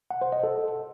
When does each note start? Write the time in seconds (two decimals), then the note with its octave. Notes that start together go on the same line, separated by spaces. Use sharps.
0.10 F#5
0.21 C5
0.32 D#5
0.43 A4